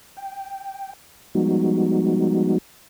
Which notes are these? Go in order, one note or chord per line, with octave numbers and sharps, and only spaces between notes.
G5
F3 G3 G#3 B3 D#4 F#4